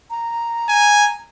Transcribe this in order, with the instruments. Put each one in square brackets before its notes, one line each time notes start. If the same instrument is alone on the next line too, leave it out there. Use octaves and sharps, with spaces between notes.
[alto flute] A#5
[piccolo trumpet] G#5